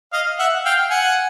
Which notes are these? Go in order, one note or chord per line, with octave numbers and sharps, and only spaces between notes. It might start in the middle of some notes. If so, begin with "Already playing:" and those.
D#5 F5
E5 F#5
F5 G5
F#5 G#5